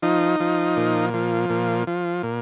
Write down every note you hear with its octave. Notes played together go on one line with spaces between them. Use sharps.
F3 D#4
F3
A#2
F3
A#2
F3
A#2